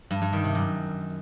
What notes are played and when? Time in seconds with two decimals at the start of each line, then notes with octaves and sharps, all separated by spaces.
0.11 G2
0.22 G2
0.33 D#3
0.44 C3
0.55 F#2